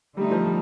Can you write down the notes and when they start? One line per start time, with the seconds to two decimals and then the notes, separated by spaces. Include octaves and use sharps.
0.17 D3 G3 A3 D#4
0.31 F3
0.46 G3